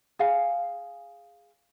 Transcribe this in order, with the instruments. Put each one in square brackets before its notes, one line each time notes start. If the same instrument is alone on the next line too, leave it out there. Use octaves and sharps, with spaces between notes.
[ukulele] G#4 F5 G#5